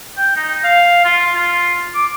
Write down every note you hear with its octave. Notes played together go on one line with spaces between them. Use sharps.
G5
D#4
F5
F4
F4
D6